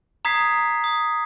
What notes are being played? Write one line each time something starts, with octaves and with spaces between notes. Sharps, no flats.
A#5 D#6 G#6 B6 C7
D#6